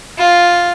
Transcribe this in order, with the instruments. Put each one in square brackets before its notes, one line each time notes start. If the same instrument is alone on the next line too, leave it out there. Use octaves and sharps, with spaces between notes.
[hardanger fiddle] F4